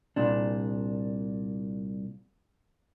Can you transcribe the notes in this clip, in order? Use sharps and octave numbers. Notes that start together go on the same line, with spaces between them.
C2 A#2 D4